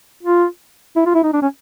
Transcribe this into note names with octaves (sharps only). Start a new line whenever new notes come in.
F4
E4
F4
E4
D#4
D4
C#4